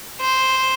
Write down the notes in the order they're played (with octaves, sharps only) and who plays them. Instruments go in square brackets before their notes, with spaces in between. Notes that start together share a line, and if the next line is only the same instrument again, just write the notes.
[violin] C5